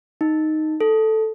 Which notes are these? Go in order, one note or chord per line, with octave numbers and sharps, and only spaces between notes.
D#4
A4